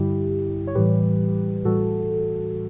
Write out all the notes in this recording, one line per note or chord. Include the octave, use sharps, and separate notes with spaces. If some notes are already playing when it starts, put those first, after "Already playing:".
Already playing: G2 D3 G3 E4 G4
C#5
A2 E3 G3 G4 B4
A2 E3 G3 F#4 A4